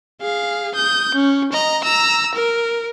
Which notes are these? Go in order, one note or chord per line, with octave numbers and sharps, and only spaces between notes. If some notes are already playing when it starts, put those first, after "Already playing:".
G#4 F5
D#6 G6
C#4
D#5 A#5
A#5 E6
A#4